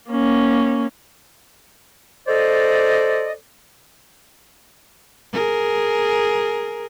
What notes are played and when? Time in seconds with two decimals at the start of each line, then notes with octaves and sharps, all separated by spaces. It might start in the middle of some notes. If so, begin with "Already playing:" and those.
0.11 A#3 C#4
2.28 A4 C5 D5 D#5
5.33 G#4 A#4